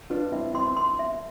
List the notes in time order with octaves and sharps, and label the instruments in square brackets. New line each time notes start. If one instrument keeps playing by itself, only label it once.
[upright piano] D4 F4 [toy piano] B4
[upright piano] C4 E4 [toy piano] E5
[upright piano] C4 E4 [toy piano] C6
[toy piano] C6
E5